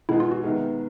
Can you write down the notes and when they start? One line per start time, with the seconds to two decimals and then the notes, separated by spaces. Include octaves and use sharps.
0.09 B2 G#3 B3 D#4 E4 G#4
0.20 F4
0.32 F#4
0.43 C3 D#3 G#3 B3